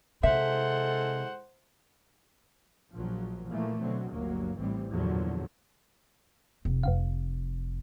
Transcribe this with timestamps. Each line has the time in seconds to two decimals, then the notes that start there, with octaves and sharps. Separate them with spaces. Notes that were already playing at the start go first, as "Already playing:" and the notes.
0.23 C3 G#3 E4 A4 C5 E5 F#5
2.93 A#1 A#2 F3 F#3
3.47 A#2 E3 F3 A3 A#3
3.80 B2 D3 F#3 C4
4.12 G1 D2 F#3 A#3
4.57 A1 A2 E3 G3 C4
4.91 E2 G2 A#2 D3 F3 F#3
6.65 F1
6.83 F2 C3 F5